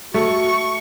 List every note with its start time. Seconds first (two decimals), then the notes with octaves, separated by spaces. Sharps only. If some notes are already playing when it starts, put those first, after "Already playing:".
0.14 A3 F#4 C#6